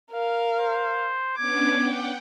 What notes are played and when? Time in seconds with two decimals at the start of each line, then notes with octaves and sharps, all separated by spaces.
0.12 A#4 F5
0.59 C5
1.37 B3 C#4 D4 D6 G#6
1.70 F#5 G5